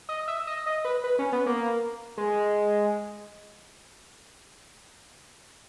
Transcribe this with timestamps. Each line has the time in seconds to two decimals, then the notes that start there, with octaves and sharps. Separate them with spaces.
0.09 D#5
0.28 E5
0.47 D#5
0.66 D#5
0.85 B4
1.04 B4
1.19 C#4
1.32 B3
1.46 A#3
2.18 G#3